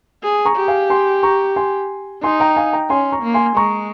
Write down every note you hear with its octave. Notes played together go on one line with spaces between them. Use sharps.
G#4
A#5 C#6
G4
F5 G#5
G#5 C6
A#5 C#6
G#5 C6
D#4 G#5 C6
G5 A#5
F5 G#5
G5 A#5
C#4 G#5 C6
A#5 C#6
A#3
G#5 C6
G#3 A#5 C#6